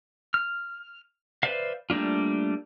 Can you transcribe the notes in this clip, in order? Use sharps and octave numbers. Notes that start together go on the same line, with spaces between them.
F6
B4 C5 D5 E5 F5
G3 A3 A#3 D4 F4